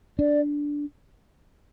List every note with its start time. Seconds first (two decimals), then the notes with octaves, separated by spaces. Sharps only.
0.19 D4 D5